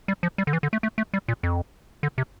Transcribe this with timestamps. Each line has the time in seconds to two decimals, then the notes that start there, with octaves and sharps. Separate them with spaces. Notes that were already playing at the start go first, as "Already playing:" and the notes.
0.08 G3
0.23 F3
0.38 G3
0.47 D3
0.53 E3
0.63 D3
0.73 A3
0.83 A3
0.98 A3
1.14 G3
1.28 A#2
1.43 F2
2.03 D3
2.18 C3